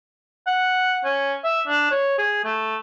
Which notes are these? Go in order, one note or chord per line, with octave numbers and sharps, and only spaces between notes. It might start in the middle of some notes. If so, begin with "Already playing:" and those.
F#5
C#4
E5
D4
C#5
G#4
A3